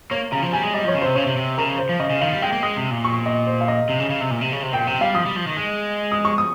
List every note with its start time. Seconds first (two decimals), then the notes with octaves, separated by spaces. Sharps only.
0.11 A#3 C#5
0.32 C#3 A#5
0.43 F3
0.53 G3 G#5
0.63 G#3
0.74 G3 D#5
0.85 F3 C#5
0.95 C#3
1.02 C3 C5
1.15 C#3 C#5
1.26 C3
1.37 C3
1.58 C#3 A#4
1.79 C5
1.89 F3
1.99 C#3 D#5
2.10 C#3
2.21 D#3 F5
2.32 G3
2.42 G#3 G5
2.52 A#3
2.63 G#3 D#6
2.77 C3
2.91 A#2
3.04 C#6
3.26 D#5
3.47 C5
3.61 F5
3.68 D#5
3.89 C3
4.00 C#3
4.10 C#3
4.21 C3
4.31 A#2
4.41 C3
4.52 C#3
4.63 C3
4.72 A#2 G5
4.87 C3 G5
5.01 G3 F5
5.15 F3 D#6
5.26 G3
5.36 F3
5.47 D#3
5.57 G#3
6.12 D#6
6.25 C#6
6.38 D#6